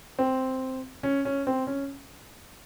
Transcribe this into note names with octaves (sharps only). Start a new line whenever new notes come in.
C4
C#4
C#4
C4
C#4